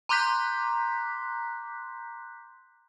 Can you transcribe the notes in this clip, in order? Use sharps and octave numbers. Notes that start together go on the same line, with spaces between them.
A#5 C6 D6 F#6 G6 B6